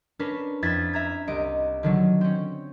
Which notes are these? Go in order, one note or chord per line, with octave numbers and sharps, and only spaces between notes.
C#4 D4 A#4 B4
F2 E4 E6 G#6 A6 B6
E5 A#5 G#6
C2 D#5 D7
D3 D#3 F#3
C4 C#4